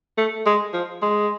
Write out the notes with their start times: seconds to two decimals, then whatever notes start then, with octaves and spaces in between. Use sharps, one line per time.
0.18 A3
0.46 G#3
0.73 F3
1.02 G#3